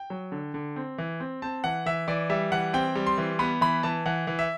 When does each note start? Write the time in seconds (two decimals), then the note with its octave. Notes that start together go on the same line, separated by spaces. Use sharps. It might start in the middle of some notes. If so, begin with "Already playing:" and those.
Already playing: G5
0.10 F#3
0.32 D3
0.54 D3
0.76 C4
0.98 E3
1.20 C4
1.42 C4 A5
1.64 E3 F#5
1.86 E3 E5
2.08 E3 D5
2.30 G3 E5
2.52 E3 F#5
2.74 C4 G5
2.95 G3
3.07 C6
3.18 E3
3.39 B3 B5
3.61 E3 B5
3.83 E3 A5
4.06 E3 F#5
4.27 E3
4.39 E5